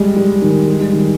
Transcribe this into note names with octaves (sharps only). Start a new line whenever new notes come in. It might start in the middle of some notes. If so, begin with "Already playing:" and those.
Already playing: G3 G#3
G3
D#3
G#3
G3
D#3